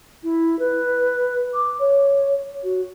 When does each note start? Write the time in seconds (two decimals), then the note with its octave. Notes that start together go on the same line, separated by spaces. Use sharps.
0.23 E4
0.59 B4
1.53 D6
1.79 C#5
2.63 F#4